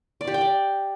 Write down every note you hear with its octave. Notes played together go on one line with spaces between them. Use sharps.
D5
G4
G5
D5